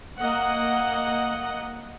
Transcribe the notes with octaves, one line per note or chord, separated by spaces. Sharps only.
A#3 D#5 F#5